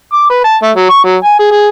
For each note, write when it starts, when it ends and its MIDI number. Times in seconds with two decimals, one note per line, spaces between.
0.13 0.25 86
0.30 0.40 71
0.44 0.57 81
0.62 0.71 57
0.76 0.88 54
0.89 1.03 85
1.05 1.16 54
1.24 1.35 80
1.39 1.49 68
1.51 1.68 68